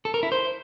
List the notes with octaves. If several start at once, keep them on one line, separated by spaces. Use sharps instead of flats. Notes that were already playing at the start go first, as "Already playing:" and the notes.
A4
A#4
E4
C5